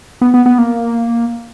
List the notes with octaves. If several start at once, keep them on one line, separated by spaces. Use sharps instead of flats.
B3
B3
B3
A#3